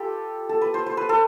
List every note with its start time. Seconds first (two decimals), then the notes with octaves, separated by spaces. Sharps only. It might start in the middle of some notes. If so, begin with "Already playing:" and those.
Already playing: F4 G4 A4 B4
0.49 A4
0.61 B4
0.74 C5
0.86 C5
0.97 B4
1.09 A4